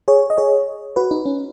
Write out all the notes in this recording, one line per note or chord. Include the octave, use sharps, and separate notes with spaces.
G#4 C#5
D#5
G#4 C#5
F#4 B4
D#4
C#4